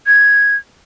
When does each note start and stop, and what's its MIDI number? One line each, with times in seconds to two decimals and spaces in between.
0.07 0.56 92